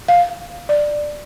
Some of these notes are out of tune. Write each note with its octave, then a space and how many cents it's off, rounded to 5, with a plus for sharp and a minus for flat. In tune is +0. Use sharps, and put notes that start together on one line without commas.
F5 +5
D5 +10